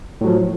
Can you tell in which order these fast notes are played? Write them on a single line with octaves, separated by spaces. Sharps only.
A2 F#3 F3